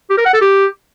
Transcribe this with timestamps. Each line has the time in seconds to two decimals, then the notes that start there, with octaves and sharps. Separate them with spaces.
0.10 G4
0.18 A#4
0.26 F#5
0.33 A4
0.41 G4